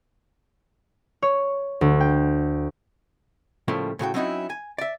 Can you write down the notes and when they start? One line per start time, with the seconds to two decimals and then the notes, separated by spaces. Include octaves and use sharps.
1.22 C#5
1.81 D2
2.01 G5
3.68 A2 C#3 F3 G3 A3 A#3
3.99 A2 C#3 F#4 G5
4.14 F#3 C4 C#4 D#4 E4 F#4
4.50 G#5
4.78 D5 E5